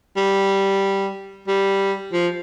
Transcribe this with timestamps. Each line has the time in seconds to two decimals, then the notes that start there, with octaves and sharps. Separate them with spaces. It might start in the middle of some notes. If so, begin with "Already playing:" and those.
0.17 G3
1.48 G3
2.13 F3